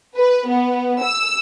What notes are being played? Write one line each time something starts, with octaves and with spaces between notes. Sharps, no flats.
B4
B3
E6